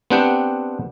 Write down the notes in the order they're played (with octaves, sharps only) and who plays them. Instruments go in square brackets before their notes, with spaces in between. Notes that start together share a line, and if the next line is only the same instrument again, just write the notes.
[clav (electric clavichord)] B3 C4 D4 G4 F#5 G5